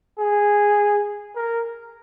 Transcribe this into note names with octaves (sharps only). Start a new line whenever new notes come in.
G#4
A#4